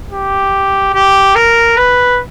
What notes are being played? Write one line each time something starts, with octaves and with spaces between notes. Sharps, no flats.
G4
G4
A#4
B4